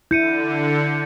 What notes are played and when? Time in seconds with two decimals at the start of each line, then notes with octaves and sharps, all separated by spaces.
0.11 D3 E4 G6 C#7 D#7